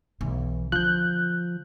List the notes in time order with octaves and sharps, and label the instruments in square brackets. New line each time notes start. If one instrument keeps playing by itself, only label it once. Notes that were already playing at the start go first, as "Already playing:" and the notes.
[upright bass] B1 E3
[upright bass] D3 [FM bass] F3 [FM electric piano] F#6 G6